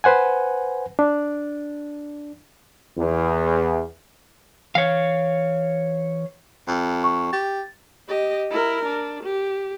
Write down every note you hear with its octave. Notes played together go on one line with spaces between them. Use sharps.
B4 C5 F#5 G#5
D4
E2
E3 C#5 F5
F2
C#6
G4 A6
G4 D#5
E4 A#4
D4
G4